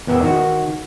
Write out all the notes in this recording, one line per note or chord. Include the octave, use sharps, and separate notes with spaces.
E2 B3 A#4 E5 G5
D#3 F#4